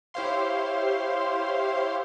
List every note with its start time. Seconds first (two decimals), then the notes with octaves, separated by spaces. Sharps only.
0.14 E4 G4 C5 C#5 F5 C6